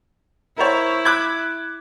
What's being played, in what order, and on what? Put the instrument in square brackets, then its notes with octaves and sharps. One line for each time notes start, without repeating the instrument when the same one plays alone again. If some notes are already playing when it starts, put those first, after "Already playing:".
[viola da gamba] E4 [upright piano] A#4 C5 C#5
[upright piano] D6 F#6 G#6